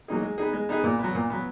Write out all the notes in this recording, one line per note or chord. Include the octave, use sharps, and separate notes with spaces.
F#3 A#3 D#4 G#4
G#3
B3 D#4 G#4
G#3
B3 D#4 G#4
A#2
F#3 B3
A#2
F#3 B3